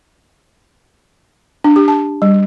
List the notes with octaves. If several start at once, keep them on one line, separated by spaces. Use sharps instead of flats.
D4
G4
A5
G3